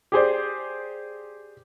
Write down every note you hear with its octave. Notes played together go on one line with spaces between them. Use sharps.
G4 G#4 C5 D5